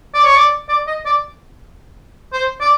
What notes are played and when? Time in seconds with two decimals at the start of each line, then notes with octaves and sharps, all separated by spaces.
0.14 D5
0.24 C#5
0.35 D5
0.69 D5
0.87 D#5
1.06 D5
2.33 C5
2.61 D5